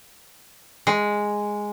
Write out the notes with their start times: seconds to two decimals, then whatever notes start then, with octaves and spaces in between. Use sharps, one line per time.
0.87 G#3